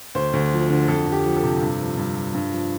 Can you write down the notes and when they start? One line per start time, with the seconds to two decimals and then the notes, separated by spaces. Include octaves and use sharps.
0.15 D2 C5
0.33 D2
0.52 F3
0.70 D3
0.88 F2 A4
1.06 F2
1.12 G4
1.24 F3
1.36 A4
1.43 C3
1.61 G2
1.79 F3
1.97 G2
2.15 F3
2.34 G2
2.52 F3